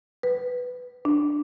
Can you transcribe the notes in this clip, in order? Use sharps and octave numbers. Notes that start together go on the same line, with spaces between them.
B4
D4